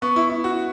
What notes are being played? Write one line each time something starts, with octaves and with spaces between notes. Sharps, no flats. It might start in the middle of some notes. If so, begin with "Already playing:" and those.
B3 C#6
E4
E4
F#4